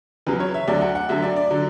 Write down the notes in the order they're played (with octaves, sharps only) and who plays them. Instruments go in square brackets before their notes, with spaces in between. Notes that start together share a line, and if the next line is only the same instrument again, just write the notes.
[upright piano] E2 C#3 F#3 B4
C#5
E5
D2 D3 F#3 D5
F#5
F#5
D2 D3 F#3 E5
D5
D5
D3 F#3